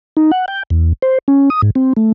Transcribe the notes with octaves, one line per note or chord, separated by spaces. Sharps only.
D#4
F#5
G5
E2
C5
C#4
D#6
G#2
C4
A3